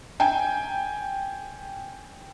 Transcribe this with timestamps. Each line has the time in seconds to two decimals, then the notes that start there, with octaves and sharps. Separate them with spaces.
0.20 G5 G#5